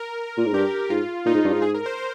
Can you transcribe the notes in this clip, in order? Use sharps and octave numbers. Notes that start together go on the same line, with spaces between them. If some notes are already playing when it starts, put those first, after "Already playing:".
Already playing: A#4
A#2
G#2
G2 G4
G#2 F4
A#2 D#4
G#2
G2
G#2
G#4
A#4
C5
C5